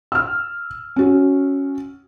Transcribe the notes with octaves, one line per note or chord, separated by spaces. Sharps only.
E6 F6
C#4 F#4